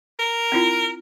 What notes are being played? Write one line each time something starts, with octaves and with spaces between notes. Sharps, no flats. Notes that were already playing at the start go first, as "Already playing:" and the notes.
A#4
C4 E4 F4